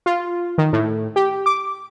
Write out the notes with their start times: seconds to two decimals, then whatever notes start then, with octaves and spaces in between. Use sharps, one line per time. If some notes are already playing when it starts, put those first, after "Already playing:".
0.06 F4
0.58 D#3
0.73 A2
1.16 G4
1.46 D6